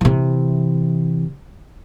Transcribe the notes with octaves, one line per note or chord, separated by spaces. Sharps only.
C3 E3